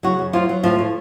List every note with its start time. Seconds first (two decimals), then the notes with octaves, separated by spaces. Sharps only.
0.03 C#3 F#3 F#4
0.19 F#2
0.33 F3 F#3 F4
0.49 F#3
0.63 A2 F3 F4
0.79 A2